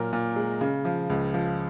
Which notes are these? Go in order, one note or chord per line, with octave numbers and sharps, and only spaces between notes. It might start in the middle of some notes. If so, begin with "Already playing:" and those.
Already playing: A#2 F#3 A#4
A#2
G#3
C#3
F3
C#2
F3